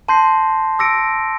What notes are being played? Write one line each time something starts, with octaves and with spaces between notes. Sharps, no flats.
A5 C6 G6 A#6 C7
D6 E6 A#6 C#7 D7